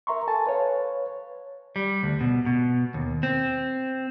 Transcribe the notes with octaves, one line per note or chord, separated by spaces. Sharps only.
A#4 E5 A#5 C6 C#6
A4 G#5 A5 A6
B4 C#5 F5
G3
D2
B2
B2
D#2
C4